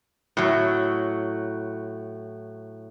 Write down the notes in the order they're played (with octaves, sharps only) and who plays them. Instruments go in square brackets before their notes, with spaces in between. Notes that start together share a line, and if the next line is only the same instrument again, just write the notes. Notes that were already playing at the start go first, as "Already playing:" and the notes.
[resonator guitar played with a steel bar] A2 F#3